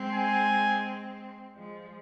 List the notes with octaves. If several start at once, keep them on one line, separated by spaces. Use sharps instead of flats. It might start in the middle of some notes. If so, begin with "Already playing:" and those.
Already playing: G#3 C4
G#5
F3 G#3